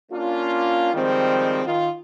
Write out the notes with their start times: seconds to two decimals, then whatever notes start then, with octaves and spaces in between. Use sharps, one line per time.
0.12 A#3 C#4 D4 F4
0.94 D#3 F3 G3 G#3 C4
1.65 D#3 F4